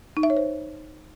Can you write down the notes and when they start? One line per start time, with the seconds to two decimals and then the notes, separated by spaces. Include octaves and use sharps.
0.17 D#4
0.23 E5
0.30 C#5
0.37 C5